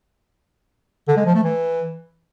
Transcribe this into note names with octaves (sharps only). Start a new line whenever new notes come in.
D3
G#3
F3
A3
E3